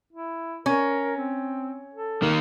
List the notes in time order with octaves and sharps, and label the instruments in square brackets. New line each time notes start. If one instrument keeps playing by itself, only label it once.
[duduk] E4
[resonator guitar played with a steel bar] C#4 [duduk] A#4
[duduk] C4
A4
[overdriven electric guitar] D#3 A#3